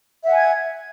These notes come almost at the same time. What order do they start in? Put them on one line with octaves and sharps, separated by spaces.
E5 F#5 G#5 G#6